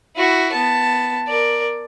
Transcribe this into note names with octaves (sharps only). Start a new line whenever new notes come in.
E4 F#4
B3 A5
A#4 D5